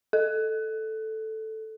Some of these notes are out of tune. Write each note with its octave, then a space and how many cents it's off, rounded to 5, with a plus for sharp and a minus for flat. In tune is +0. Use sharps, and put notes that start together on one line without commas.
A4 +0